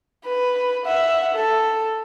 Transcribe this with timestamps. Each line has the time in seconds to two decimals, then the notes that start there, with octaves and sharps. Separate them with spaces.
0.24 B4
0.86 E5 F#5
1.35 A4